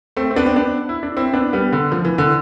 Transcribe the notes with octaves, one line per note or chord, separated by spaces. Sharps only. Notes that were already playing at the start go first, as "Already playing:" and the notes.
A3 C4
C4
B3 D4
C4
B3 D4
E4
D4
C4 E4
B3 D4
G3 B3
D3
F3
E3
D3